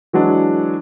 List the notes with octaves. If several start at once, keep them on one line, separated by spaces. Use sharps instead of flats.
E3 F#3 G#3 D4